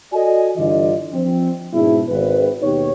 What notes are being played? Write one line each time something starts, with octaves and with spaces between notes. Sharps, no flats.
F#4 A4 D5 D#5 G#5
G2 D3 E3 F4 D5 D#5
F3 C4
G#2 B2 G#3 D4 E4
G#1 B4
D#2 B2 D#4 G4 C#5